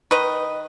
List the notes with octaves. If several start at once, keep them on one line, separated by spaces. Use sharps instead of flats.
D#3 B4 D#5